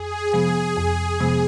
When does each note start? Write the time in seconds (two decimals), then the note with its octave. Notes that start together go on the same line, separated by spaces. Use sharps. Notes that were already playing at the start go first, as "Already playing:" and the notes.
Already playing: F2 G#4
0.33 C3 F3 G#3 B3
0.77 F2
1.20 C3 F3 G#3 B3